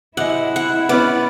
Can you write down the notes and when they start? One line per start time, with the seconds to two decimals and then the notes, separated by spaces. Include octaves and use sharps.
0.17 C3 G#3 E4 F#5
0.56 F#5
0.89 B3 C#4 B4 D5